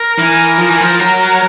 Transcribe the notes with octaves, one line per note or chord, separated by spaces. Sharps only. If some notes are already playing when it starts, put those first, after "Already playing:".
Already playing: A#4
E3
F3
E3
F3
F#3